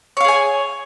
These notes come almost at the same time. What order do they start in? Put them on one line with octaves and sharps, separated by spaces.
C#5 F5 G#4 G#5